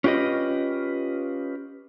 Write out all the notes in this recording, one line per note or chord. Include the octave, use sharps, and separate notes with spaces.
C#4 F4 G4 B4 D#5